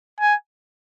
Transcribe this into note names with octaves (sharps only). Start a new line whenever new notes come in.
G#5